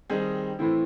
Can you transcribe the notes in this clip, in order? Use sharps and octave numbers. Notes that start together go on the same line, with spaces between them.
D#3 G3 C4 D#4 G#4
A2 E3 A3 C4 E4